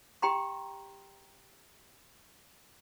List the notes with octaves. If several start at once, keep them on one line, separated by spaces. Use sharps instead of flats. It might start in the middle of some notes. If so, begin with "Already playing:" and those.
G4 G5 A#5 C6